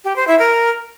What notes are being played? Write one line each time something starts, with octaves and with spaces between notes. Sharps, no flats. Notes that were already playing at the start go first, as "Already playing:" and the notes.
G4
C5
E4
A#4